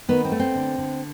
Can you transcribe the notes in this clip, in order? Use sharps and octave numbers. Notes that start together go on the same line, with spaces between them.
D#3 B3
C4
A3
C4
D3
D3